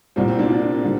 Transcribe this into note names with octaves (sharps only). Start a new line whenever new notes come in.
C2 A#2 G3 C4
C4
A#3 D4
D4 F4
D3 G3